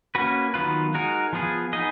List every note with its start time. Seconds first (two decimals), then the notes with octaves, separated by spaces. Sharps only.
0.15 A#3 C#4 F#4 B4
0.54 D#3 F#3 B3 F4 B4
0.94 G#3 D#4 F#4 A#4
1.33 F3 B3 F4 G#4
1.73 B3 D#4 G#4 D#5